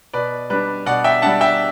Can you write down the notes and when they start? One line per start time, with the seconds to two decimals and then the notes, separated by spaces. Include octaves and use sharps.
0.14 B2 B4 D5
0.50 G3 D4 B4
0.86 B2 D5 F#5
1.04 E5 G5
1.22 G3 D4 F#5 A5
1.41 E5 G5